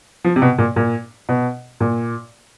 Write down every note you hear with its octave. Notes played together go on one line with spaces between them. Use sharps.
F3
C3
B2
A#2
A#2
B2
A#2